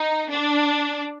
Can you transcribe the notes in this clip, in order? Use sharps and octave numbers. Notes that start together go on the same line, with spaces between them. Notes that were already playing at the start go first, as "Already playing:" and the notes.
Already playing: D#4
D4